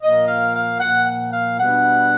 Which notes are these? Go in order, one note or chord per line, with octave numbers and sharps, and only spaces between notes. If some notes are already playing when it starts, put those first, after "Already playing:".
A#2 F3 A#3 D#5
F5
F5
A#2 F3 A#3 F#5
F#5
F5
B2 G3 B3 D4 F#5